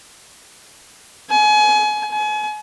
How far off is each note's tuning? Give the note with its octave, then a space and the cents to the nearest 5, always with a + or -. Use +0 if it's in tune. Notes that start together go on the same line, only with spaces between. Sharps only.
G#5 +30
G#5 +35